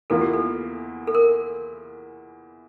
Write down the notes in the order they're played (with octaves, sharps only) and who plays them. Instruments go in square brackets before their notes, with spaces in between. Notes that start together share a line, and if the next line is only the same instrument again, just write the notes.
[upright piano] E2 E3 A#3 F4 [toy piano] A4
[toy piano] G4
A4
A4
A#4